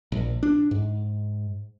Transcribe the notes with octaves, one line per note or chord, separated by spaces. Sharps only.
A#1
D4
G#2